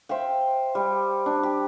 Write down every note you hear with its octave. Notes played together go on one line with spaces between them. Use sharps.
C5 E5 F5 G5
G3
D4
G4